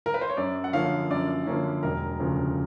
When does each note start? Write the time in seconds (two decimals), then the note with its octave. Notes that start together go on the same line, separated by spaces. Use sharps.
0.06 A#4
0.14 B4
0.21 C5
0.30 C#5
0.37 F#2 D5
0.64 F#5
0.73 D3 F3 A#3 C#4 F5
1.10 F#2 D5
1.47 D3 F3 A#3 C#4
1.83 E1 A#4
2.19 D2 C#3 F3